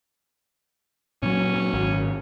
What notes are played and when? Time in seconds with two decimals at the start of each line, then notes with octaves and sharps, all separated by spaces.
1.23 A#2 F#3 C#4
1.73 G#1